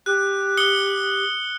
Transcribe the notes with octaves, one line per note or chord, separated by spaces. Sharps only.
G4 F#6
D#6 C#7 G7